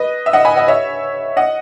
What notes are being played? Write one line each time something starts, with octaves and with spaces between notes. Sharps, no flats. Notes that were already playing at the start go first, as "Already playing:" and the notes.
Already playing: B4 D#5
E5
D#5 F#5
G#5 B5
D#5 F#5
C#5 E5
D#5 F#5